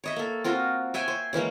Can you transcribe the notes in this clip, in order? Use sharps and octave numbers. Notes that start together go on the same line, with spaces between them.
C#5 D#5 E5
A#3 A4
C4 F4 F#4 A#4
C#5 E5 G5 G#5
C5
C#3 E3 G#3 A#3